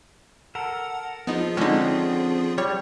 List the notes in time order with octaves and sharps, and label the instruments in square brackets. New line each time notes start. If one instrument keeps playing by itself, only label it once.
[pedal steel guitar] A4 A#4 [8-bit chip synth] F#5
[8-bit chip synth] F3 F4 G#4 [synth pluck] B3 D#4
[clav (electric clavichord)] D3 C#4 [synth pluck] G#3 D#4 [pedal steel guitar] C4
[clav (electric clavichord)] G3 [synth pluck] C#5